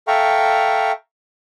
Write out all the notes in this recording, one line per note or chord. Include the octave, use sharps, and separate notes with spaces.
A4 E5 F5 G5 A#5 C#6